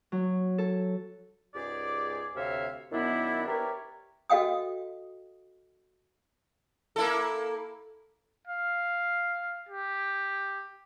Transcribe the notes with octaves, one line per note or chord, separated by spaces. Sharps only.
F#3
A4
C#2 G#2 G4 G#4 D5 D6
D2 C3 C#5 E5 F5
F#2 D#3 B3 D4 E4
G4 A#4 B4 C#5 D5 E5
F#4 A4 D#5 F5 G5 D#6
A#3 E4 A4
F5
G4